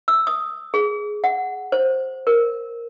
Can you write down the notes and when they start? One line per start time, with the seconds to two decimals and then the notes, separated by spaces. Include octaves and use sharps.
0.08 E6
0.27 D#6
0.74 G#4
1.24 F#5
1.72 C5
2.27 A#4